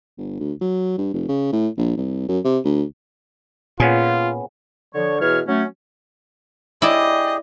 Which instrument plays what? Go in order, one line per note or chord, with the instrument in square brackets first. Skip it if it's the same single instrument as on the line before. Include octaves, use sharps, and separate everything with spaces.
[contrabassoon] G1
D2
F#3
G2
F1
C#3
A2
A#1
C2
F#2
C3
D2
[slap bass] A#2 [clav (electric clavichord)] B3 C#4 G#4 [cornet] F4
[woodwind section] D3 F3 C#5
B2 E3 F#4 G#4 C#5 F6
F#3 A3 C#4
[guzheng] E4 D5 [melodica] G4 G#4 [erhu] D#5